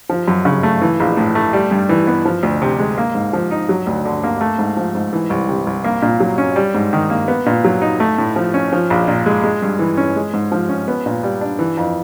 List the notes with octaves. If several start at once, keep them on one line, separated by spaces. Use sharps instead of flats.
F3
F#2
C#3
A3
E3
A#1
A2
A3
G3
G2
E3
B3
F3
D2
C3
G#3
A#3
G#2
F3
D#4
F#3
D2
D3
A#3
A3
G#2
F3
G#2
E3
C2
C3
C2
A#3
A#2
F#3
C#4
G3
G#2
D#3
A#3
B3
A#2
F#3
D#4
A3
A2
F3
C#4
F3
A#1
A#2
G#3
G#3
G2
E3
C#4
G#3
G#2
F3
C#4
B3
A#2
G3
D4
E3
F2